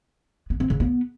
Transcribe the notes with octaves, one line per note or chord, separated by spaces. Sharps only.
B3
C4
C#3
B3